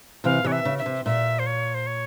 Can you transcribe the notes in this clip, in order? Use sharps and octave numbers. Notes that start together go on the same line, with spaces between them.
C3 E3 F5
C3 E3 C#5
E5
C#3
E5
C3
A#2 E5
C5
C#5
C5
C#5